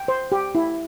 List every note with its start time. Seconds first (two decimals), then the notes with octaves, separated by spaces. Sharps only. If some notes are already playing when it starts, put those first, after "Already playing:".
Already playing: G5
0.08 C5
0.32 G4
0.55 E4